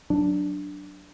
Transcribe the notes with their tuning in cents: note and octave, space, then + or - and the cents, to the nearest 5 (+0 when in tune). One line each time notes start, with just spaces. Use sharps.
F#3 +5 D4 +0